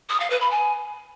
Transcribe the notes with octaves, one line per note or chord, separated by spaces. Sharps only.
D#6
F5
B4
B5
G#5